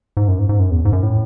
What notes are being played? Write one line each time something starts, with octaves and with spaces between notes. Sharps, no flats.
G#2
F#2
G#2
G#2
F#2
E2
G#2
F#2
A2